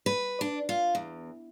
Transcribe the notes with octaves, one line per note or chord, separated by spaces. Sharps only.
B4
D4
F4
E2